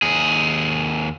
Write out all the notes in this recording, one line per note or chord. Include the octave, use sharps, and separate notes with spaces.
D#2 G#4